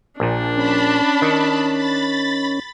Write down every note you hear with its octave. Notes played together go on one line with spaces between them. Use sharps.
A#1 A#2 D4
C#4 A5 B5
D#3
B5 A6